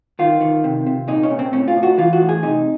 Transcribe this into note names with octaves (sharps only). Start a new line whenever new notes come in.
D#3 F4
D#3
C3
C3
A#2 D#4
C#4
A#2
C4
A2 C#4
F4
A2
F#4
E3 F4
F#4
A2
G#4
C3 D#4